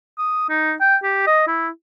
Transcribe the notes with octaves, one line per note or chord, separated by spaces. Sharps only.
D#6
D#4
G5
G4
D#5
E4